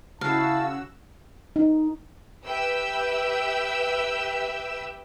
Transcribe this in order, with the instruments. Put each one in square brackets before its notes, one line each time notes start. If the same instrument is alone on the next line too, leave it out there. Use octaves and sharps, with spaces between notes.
[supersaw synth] C#3 F#4 E6 [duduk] E4 [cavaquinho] F5 [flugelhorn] A5
[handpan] D#4
[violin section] G4 B4 E5 G5 E6